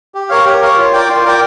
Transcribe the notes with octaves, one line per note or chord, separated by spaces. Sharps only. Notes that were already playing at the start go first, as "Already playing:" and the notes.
G4
A#4 C#5 F5
G4
A#4 C#5 F5
F4
A#4 D5 G5
F4
A#4 D5 G5